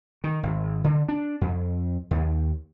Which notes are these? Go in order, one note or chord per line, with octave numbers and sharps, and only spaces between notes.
D#3
G#1
D3
D4
F2
D#2